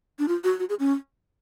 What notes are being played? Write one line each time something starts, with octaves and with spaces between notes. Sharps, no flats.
D4
F4
F#4
F#4
G#4
C#4